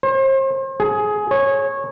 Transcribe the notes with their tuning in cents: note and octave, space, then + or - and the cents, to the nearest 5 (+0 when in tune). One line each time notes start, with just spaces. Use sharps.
C5 +40
G#4 +15
C#5 -20